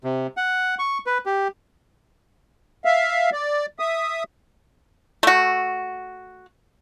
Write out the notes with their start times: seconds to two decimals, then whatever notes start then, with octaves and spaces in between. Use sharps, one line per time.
0.04 C3
0.37 F#5
0.79 C#6
1.06 B4
1.26 G4
2.85 E5 F5
3.32 D5
3.79 E5 D#6
5.23 A3 F#4